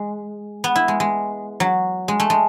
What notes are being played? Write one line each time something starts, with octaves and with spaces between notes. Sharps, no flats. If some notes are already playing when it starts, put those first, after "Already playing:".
Already playing: G#3
B3
E4
G#3
G#3
F#3
G#3
A3
G#3